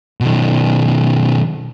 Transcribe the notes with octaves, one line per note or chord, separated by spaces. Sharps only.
B2 D#3